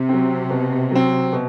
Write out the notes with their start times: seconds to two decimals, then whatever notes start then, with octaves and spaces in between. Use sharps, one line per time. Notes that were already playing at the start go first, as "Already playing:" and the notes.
Already playing: C3
0.09 F#3 C4
0.50 B2
0.91 F#3 C4
1.32 B2